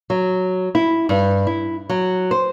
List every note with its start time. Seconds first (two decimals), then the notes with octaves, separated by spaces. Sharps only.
0.10 F#3
0.75 E4
1.09 G2
1.47 E4
1.89 F#3
2.31 C5